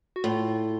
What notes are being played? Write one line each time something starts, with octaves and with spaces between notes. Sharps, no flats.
F#4
A2 F4